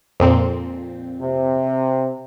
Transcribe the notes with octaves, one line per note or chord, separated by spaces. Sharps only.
F2 A#2 C4
C3